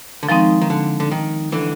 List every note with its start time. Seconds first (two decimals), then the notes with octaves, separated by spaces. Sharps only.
0.23 D3
0.29 D#3 F3 G#3 C4 D#4
0.61 D#3
0.70 D3
1.00 D3
1.11 D#3
1.52 D3 E3